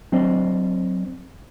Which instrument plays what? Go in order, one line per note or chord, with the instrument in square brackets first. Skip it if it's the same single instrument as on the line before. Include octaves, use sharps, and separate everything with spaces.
[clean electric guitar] F#3 C4 D4 C5 D5 D#5